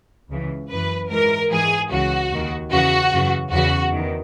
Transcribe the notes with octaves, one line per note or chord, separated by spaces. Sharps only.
C#2 C#3 E3
F#2 E3 B4
G#2 E3 A#4
G#2 E3 G#4
C#2 C#3 E3 F#4
D#2 D#3
E2 C#3 E3 F#4
F#2 C#3 E3
E2 C#3 E3 F#4
E2 D#3